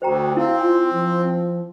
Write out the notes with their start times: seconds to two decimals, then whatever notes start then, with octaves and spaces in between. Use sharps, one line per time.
0.02 D2 F#4 C5 G5 A#5
0.37 C4 E4 F5
0.61 F4 G#5
0.93 F3